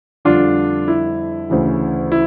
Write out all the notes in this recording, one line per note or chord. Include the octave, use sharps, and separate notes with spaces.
F2 D3 G3 D4 F4
E4
D2 C#3 E3
E4